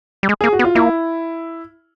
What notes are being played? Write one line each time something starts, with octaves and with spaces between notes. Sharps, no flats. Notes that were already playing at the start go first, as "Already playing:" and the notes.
G3
G#3
A#3 G#4
F#4
B3
F4
A#3 E4